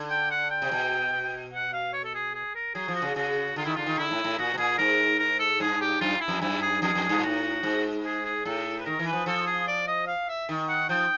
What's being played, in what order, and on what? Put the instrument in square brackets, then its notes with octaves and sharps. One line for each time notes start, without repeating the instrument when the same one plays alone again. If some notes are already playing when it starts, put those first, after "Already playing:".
Already playing: [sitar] D3
[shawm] G5
F#5
G5
[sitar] C3
B2
[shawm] F#5
F5
C#5
A4
G#4
G#4
A#4
[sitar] F#3 [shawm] G#4
[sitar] F3
[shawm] F#4
[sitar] C#3
[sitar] C#3 [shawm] F#4
[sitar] D3 [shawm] F4
[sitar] D#3 [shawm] E4
[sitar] D3 [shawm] F4
[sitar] D#3
[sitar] D3 [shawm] E4
[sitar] A2
A2
[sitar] A#2 [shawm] F#4
[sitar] B2
[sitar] A#2 [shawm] G#4
[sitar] G#2 [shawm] A#4
[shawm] A#4
A4
[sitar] G2 [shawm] G#4
[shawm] G4
[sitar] F#2 [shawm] F4
[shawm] E4
[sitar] F2
[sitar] F#2 [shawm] E4
[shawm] G#4
[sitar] F2 [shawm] G#4
[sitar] F2
[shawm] G#4
[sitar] G2
A#2
[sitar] A2 [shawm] F#4
[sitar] G#2
[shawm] G#4
G#4
[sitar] A2 [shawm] A4
[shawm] B4
[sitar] D#3 [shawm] A#4
[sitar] E3
[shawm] B4
[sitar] F3
[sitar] F3 [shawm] A4
[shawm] G#4
D5
D#5
F5
E5
[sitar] D#3
[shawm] F#5
[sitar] F3 [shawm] G5